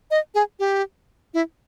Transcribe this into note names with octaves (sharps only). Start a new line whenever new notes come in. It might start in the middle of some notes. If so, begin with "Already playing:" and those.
D#5
G#4
G4
E4